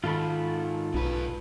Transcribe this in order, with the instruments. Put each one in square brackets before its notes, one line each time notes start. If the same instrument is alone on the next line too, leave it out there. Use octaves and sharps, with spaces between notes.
[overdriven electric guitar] G#2 D#3 [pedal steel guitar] F4 A4 B5
[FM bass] B1 [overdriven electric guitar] G#2 B4